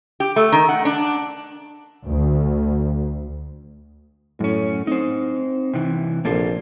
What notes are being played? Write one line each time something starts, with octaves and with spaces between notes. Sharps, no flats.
G4
A3
D#3
F#5
D4
D2
F#2 A2 C#4
C4 D#4 C5
C3 E3
A#1 A#3 A4 C5